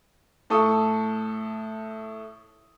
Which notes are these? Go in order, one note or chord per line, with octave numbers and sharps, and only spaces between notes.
A2 A4 C#6 D#6